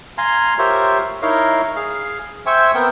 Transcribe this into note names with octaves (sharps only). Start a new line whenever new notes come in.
F5 G#5 A#5 C6
F4 G4 A#4 C5 C#5 E5
D#4 E4 A#4 C#5 D#5 F5
G#4 F5
C5 E5 G5 G#5 C#6
B3 C4 A#4 G5